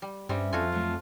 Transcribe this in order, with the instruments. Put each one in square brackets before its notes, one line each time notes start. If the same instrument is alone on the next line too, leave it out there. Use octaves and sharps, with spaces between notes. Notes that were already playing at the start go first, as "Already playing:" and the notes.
[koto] G3
[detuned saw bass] G2 [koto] G3 C4 [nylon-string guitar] C#4 G4 E5
[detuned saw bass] F2 [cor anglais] F4 [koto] F#4 A4 G#5
[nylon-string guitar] F#3 A3